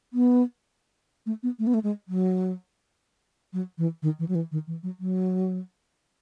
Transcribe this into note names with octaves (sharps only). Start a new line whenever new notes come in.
B3
A3
B3
A3
B3
A3
G#3
F#3
F#3
E3
D#3
E3
F#3
E3
D#3
E3
F#3
F#3